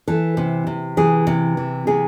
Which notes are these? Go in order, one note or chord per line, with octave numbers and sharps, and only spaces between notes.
E3 A4
C3
C3
E3 G#4
C3
E3
C3 G#4